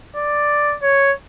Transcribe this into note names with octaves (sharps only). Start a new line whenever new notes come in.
D5
C#5